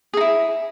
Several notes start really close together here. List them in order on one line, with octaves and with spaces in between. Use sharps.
G#4 D#4 E4